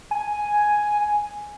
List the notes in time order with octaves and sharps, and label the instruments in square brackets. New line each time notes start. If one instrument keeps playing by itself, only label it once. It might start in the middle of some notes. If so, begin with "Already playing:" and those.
[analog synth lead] G#5